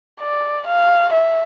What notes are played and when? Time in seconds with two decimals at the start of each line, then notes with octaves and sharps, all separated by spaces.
0.21 D5
0.67 F5
1.13 E5